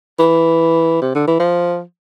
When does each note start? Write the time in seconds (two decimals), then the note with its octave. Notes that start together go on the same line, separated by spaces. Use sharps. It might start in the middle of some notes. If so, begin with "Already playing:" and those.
0.20 E3
1.02 C3
1.15 D3
1.27 E3
1.40 F3